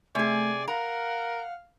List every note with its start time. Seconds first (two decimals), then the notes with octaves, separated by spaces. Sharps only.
0.15 C3 A3 G#4 D5 G#5
0.68 A#4 F5 F#5 A#5